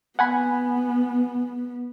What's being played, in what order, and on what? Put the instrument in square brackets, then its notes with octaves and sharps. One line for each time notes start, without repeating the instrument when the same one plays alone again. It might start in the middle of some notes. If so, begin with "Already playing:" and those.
[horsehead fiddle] B3 [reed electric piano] F#5 G#5 B5